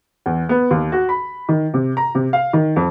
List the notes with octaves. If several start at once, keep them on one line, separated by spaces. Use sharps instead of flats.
E2
B3
D#2
F#4
B5
D#3
C3
A#5
C3
F5
D#3
F2